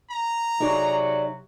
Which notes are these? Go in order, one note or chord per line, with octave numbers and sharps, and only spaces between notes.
A#5
C3 F#3 D#4 F#4 G#4 D5